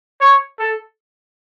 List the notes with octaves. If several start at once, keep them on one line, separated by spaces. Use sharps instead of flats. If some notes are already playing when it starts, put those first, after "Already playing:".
C#5
A4